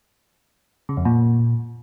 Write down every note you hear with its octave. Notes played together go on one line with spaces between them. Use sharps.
C#3
F2
A#2